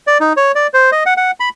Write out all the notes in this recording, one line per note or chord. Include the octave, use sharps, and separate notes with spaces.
D5
D#4
C#5
D5
C5
D#5
F#5
F#5
B5